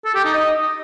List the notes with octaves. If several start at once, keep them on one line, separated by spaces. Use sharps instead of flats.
A4
G4
D#4
D#5